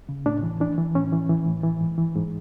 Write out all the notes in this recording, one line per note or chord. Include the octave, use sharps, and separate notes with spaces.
C#3
A2 D4
E3
E3 D4
E3
A2 C#4
E3
E3
A2
E3
G#2
E3
G#2